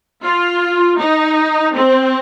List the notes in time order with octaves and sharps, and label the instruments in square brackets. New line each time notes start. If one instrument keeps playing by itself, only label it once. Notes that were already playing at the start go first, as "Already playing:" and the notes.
[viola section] F4
D#4
C4